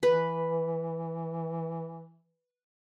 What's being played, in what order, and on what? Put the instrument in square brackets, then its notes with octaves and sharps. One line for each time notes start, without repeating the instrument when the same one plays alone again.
[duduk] E3 [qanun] B4